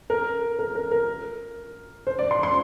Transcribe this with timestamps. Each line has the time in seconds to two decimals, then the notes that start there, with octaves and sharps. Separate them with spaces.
0.10 A#4
0.59 A#4
0.75 A#4
0.91 A#4
2.07 C5
2.19 D5
2.31 C6
2.43 C6